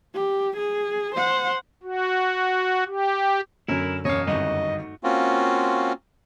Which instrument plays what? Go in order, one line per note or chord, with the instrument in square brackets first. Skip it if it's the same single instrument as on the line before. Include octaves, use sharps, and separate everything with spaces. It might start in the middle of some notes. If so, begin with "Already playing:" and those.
[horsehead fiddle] G4
G#4
C5 F#5
[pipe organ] F#4
G4
[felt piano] F#2 [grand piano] D3 F#3 [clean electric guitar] E4 A#4
[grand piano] E1 [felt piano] F#2 [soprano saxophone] C#5 [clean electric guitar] D#5 F5
[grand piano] G#1 D2 G2 [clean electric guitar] A3 D#4 F#4 [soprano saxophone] D#5
[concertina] A#3 C4 C#4 F4 F#4